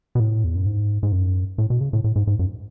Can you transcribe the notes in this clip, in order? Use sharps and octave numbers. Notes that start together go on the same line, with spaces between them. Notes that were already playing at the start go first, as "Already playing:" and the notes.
B2
A2
E2
F#2
G#2
G#2
F#2
A2
B2
C#3
A2
A2
G#2
G#2
F#2